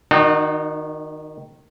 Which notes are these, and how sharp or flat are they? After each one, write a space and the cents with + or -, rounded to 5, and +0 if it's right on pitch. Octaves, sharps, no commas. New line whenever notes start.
D#3 +0 D#4 -45 F#4 +0